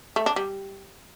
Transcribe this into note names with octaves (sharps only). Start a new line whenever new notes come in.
A3
D4
G3